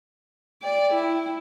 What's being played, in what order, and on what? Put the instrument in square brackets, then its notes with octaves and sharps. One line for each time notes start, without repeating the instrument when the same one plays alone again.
[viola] D5 [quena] G5
[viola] E4